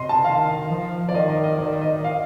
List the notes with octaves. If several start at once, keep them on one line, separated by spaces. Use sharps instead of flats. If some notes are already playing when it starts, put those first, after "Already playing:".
Already playing: C3 D#5 C6
A5
D#3 F5
F3
D5
D#3 D#5
D#5
D#5
D#3 D5
D#5
F5